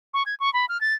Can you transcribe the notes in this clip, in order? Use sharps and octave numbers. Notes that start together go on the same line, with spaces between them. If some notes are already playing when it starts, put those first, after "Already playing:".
C#6
G#6
C#6
B5
F6
A6